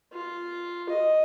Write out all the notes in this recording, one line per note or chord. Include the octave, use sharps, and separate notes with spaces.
F4
D#5